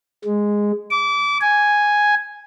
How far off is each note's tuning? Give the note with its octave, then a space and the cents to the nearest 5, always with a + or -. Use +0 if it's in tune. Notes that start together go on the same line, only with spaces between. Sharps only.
G#3 -5
D6 -25
G#5 +0